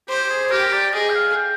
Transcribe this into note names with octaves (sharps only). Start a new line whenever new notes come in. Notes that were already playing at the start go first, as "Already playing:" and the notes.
G4 C5
G4
G#4
G4 A#4
D5
G#4 D#5
G5
F5
G5